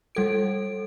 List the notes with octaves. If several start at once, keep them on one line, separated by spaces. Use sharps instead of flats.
G3 A4 D7